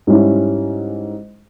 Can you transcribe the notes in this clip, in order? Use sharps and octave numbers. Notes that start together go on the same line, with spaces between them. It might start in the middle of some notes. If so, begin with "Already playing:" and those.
G#2 G3 C#4 E4